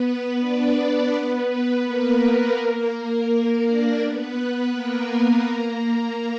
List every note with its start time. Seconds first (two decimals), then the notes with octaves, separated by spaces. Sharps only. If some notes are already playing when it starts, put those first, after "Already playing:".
Already playing: B3 B4
0.39 D4 D5
1.12 B3 B4
1.84 A#3 A#4
3.28 A#3 A#4
3.64 D4 D5
4.00 B3 B4
4.72 A#3 A#4
5.45 A#3 A#4